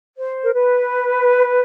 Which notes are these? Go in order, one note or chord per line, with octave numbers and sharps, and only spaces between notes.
C5
A#4
B4